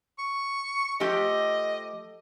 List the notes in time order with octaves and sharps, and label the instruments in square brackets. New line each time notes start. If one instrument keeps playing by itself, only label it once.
[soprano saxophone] C#6
[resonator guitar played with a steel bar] F3 A3 G4 [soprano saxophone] D#5